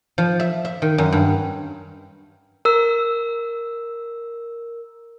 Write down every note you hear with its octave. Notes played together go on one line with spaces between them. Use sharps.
F3
E5
E5
D#3
F#2
G2
A#4 E6